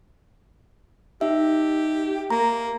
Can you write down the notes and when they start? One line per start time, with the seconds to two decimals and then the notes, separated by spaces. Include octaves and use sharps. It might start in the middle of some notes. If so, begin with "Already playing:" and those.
1.21 D#4 G4 E5
2.30 A#3 A#5